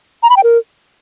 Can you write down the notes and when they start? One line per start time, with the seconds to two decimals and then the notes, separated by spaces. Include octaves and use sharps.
0.23 A#5
0.30 B5
0.37 G5
0.43 A#4